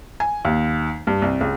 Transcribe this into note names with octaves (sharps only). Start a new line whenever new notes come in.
G#5
D#2
G2
C2
C#2